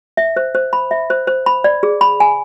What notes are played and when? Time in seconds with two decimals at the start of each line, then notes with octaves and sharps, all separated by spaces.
0.17 E5
0.36 C5
0.55 C5
0.73 B5
0.91 E5
1.10 C5
1.27 C5
1.46 B5
1.64 D5
1.83 G#4
2.01 B5
2.20 G#5